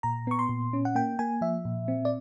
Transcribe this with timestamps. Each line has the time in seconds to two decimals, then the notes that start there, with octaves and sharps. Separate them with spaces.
0.03 A#2 A#5
0.27 B3 C#6
0.39 C6
0.49 A#2
0.73 C#4
0.85 F#5
0.95 A#3 G5
1.19 A#3 G#5
1.41 F3 E5
1.65 A#2
1.88 C4
2.05 D5